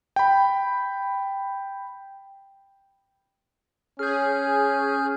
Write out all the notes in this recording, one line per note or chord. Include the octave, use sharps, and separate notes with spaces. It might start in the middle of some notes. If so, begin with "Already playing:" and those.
G5 B5
C#4 G#4 F6 G6